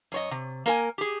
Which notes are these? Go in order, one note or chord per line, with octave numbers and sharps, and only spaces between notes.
F#2 C#5 D#5
C3
A#3 A#4 G#5
G4 G#4